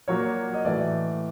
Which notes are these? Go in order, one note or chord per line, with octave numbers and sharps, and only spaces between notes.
A#2 F#3 A#3 C#5
D#5
A2 E3 A3 D5